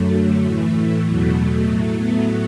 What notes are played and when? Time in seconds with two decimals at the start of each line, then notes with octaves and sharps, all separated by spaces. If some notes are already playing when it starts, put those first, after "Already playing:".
Already playing: F#2 D3 F#3 A3
0.43 A2 E3 A3
1.04 E2 B2 F#3 A3
1.34 A3
1.64 A2 F#3 A3
1.95 B3